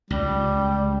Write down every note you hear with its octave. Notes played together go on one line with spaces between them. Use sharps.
C#2 G3